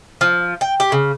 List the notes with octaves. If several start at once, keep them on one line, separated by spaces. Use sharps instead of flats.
F3
G5
G4
C#3